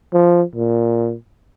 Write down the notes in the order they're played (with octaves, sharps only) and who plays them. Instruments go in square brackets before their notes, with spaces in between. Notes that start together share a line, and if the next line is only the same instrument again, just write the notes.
[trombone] F3
A#2